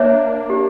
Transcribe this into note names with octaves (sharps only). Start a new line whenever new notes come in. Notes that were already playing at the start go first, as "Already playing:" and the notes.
Already playing: A#3 D4 C#5 E5
G4